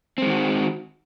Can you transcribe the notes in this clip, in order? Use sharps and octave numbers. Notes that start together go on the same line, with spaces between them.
D#3 G#3 C4 F#4